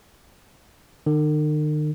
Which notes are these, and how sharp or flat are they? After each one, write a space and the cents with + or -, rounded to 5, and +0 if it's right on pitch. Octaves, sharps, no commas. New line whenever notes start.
D#3 -45